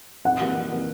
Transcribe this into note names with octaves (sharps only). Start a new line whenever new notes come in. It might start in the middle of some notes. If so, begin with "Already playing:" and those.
F2 F#5
C3 E3 G3 A#3
F2
C3 E3 G3 A#3